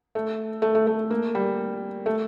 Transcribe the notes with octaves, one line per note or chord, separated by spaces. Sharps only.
A3
A3
A3
A3
A#3
G3
A3